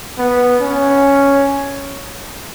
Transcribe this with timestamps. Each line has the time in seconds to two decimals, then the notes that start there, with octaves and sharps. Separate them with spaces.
0.18 B3
0.61 C#4